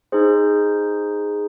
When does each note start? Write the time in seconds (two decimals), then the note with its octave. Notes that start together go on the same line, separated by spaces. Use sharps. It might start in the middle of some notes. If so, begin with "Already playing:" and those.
0.12 D#4 G#4 C5